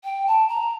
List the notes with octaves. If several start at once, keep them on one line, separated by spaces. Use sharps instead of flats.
G5
A5
A#5